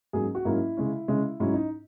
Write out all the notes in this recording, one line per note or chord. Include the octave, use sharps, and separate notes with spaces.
G#2 F#3 A#3 C#4 G#4
F#4
G#2 F#3 A#3 C#4 E4
C#3 G#3 C#4
C#3 G#3 C#4
G#2 F#3 C#4 E4
D#4